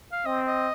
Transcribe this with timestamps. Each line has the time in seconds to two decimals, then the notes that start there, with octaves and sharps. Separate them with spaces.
0.12 F5
0.25 C4 D#5
0.46 D#5